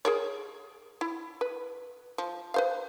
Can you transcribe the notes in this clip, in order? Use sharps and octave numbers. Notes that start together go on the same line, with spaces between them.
G#4 A#4 C#5
E4
B4
F3
B4 C5 F5